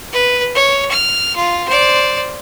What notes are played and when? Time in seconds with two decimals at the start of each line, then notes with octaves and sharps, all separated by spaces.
0.12 B4
0.55 C#5
0.91 F6
1.36 F4
1.68 C5 D5